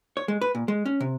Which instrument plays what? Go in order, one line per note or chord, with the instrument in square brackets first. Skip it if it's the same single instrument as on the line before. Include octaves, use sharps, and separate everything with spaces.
[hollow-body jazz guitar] C#5
G#3
B4
A#2
G#3
C#4
C3